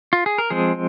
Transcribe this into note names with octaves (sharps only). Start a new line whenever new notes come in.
F4
G#4
A#4
F3 G#3 C4 G#4